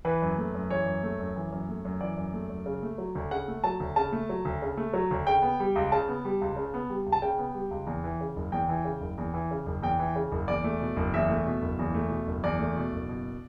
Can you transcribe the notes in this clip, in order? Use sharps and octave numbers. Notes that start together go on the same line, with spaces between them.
E3 B4
F#2
A3
F#2
E3 C#5
F#2
A3
F#2
E3
F#2
A3
F#2
E3 D5
F#2
A3
F#2
C#3
A3
F#3
D2
C#3 F#5
A3
F#3 A5
D2
C#3 A5
A3
F#3
D2
C#3
A3
F#3
D2
C#3 G5
B3
G3
C#2
C#3 A5
B3
G3
C#2
C#3
B3
G3
C#2
A5
C#3 G5
B3
G3
C#2
E2
E3
C#3
F#1
E2 G5
E3
C#3
F#1
E2
E3
C#3
F#1
E2 G5
E3
C#3
F#1
E2 D5
A3
B2
F#1
E2 E5
A3
B2
F#1
E2
A3
B2
F#1
E2 D5
A3
B2
F#1
B2